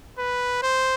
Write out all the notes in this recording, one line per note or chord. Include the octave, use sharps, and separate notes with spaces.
B4
C5